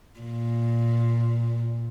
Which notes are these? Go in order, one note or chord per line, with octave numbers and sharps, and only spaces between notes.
A#2